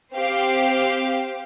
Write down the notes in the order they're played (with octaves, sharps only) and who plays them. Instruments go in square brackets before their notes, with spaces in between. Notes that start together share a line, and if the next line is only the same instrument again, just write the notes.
[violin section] C4 G4 C5 F5